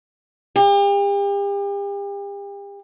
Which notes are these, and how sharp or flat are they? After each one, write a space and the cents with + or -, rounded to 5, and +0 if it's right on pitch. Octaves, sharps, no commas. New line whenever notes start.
G4 +40